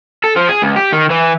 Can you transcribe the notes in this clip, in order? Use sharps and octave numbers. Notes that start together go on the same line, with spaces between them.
A4
F3
G#4
C#2
G4
D#3
E3